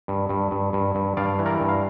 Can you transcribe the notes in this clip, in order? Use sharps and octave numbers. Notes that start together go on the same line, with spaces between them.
G2
G2
G2
G2
G2
G2 D5 F5
E3
A#4 D5
G2
F5